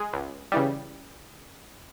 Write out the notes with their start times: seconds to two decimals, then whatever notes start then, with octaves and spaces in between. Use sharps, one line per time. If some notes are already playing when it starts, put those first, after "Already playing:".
Already playing: G#3 G#4
0.13 C#2
0.52 C#3 E3 G3